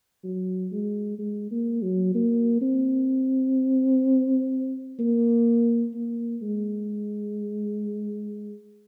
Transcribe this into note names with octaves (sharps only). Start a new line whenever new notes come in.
F#3
G#3
G#3
A#3
F#3
A#3
C4
A#3
A#3
G#3